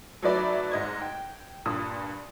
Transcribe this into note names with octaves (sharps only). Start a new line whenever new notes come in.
F#3 A3 D#4 B4 D5 E5
G#2 D#5 G#6
G5
G2 A#2 D#6